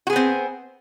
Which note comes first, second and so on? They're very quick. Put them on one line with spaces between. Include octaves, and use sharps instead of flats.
F#4 G#4 B3 C4